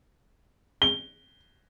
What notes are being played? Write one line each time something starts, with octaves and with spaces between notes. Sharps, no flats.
G7